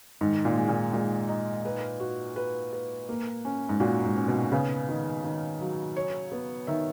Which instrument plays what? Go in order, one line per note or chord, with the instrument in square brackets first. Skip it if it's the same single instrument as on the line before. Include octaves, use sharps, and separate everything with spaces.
[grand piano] G#2 [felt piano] D#3
[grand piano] A#2
[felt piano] G#3
[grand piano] A#2
[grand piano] A#2 [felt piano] G#3
[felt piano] D#4
B4
F#4
B4
B4
A#3
C#4
[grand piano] G#2
[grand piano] A#2 [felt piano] F#4
[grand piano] G#2
[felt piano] C#4
[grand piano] B2
[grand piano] C#3 [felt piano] B3
[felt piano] D#3
D#3
F#3
C#5
B3
[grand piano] D#3 [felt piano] E5